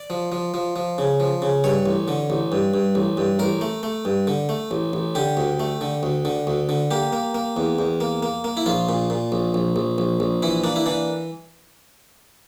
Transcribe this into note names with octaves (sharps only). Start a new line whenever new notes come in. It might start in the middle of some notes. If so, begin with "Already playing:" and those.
Already playing: D5
F3
F3
F3
F3
C#3
F3
C#3
G2 C#5
A1
D3
A1
G2
G2
A1
G2
A1 A#4
A3
A3
G2
D3
A3
A1
A1
D3 G4
D2
A3
D3
D2
D3
D2
D3
A#3 G4
A#3
A#3
E2
E2
A#3
A#3
A#3
E4
A#1 F4
A#2
A#2
A#1
A#1
A#1
A#1
A#1
E3 E4
A#3 D4
E4
E3 D4